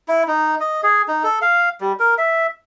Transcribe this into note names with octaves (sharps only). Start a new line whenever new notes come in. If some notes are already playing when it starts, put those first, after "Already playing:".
E4
D#4
D#5
G#4
D#4
A4
F5
G3
A#4
E5